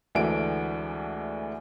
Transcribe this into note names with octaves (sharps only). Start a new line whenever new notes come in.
D2 E3 G#3 A3 D4 D7